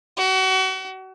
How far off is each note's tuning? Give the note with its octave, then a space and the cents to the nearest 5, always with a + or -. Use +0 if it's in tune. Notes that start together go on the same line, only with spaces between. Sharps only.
F#4 +35